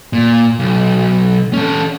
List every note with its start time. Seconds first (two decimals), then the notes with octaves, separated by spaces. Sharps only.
0.13 A#2
0.60 B1
1.53 C#4 A4